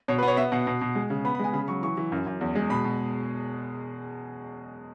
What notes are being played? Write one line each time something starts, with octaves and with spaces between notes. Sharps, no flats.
B2 C#5
B4
B3 C#5
B3 E5
B2 F#5
B2
B2
G#3
C#3
B3 B5
B5
G#3 G#5
C#3 B5
F#3 C#6
E3 C#6
E3
F#2
F#2
E2
G#3
B2 B5
B2